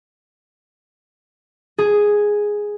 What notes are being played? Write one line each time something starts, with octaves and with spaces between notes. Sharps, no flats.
G#4